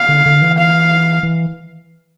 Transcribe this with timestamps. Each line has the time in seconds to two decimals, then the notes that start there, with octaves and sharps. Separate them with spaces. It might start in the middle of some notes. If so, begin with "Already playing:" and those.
Already playing: F5
0.09 D3
0.26 D3
0.42 E3
0.58 F5
1.23 E3